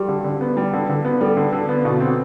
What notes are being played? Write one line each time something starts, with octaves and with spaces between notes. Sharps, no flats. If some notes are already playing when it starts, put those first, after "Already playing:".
Already playing: G3 G4
D3
D3
B3
G3
D3
D3
B3
G3 A4
D3
D3
B3
B2
C4